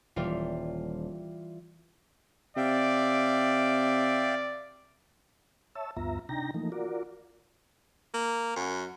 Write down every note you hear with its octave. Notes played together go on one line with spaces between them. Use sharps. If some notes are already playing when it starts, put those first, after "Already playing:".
D#1 E3 G3 F4
C3 D5 E5 F5 G5
C#5 E5 A5 E6
D2 G2 B3 F4 E5 A#5
C3 D4 D#4 G5 A#5 A#6
E3 F3 A3 A#3 D#4
F4 F#4 A#4 D5
A#3
F#2